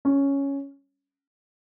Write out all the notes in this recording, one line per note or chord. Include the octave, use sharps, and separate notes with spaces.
C#4